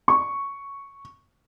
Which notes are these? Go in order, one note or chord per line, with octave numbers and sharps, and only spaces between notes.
C#6